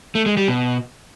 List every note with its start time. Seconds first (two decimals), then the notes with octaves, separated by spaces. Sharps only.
0.15 A3
0.26 G#3
0.37 G3
0.48 B2